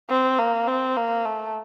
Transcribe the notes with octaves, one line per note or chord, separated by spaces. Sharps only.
C4
A#3
C4
A#3
A3